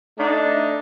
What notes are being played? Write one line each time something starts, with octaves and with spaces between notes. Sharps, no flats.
A3 D4 D#4